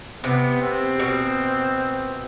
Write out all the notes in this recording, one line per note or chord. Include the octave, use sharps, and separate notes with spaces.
C3 B3
C4
B2